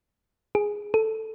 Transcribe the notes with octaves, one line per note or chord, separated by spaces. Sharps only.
G#4
A4